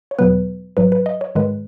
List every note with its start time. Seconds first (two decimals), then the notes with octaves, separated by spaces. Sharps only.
0.11 C#5
0.19 E2 B2 F#3 B3 B4
0.77 G#1 G#2 F#3 B4
0.92 B4
1.06 D#5
1.21 C#5
1.35 G#2 D#3 G#3 B4